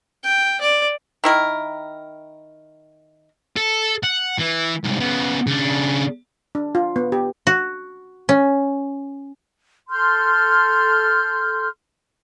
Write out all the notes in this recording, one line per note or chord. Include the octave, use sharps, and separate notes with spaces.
G5
D5
D#3 E4 A#4
A4
F#5
E3
C2 G#2
C#3 B3
C#3 D4
D4
F4
B3
G4
F#4
C#4
A4 C6 F6 G6